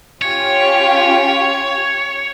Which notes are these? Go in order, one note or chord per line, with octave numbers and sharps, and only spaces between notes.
C#4 F4 G4 C#5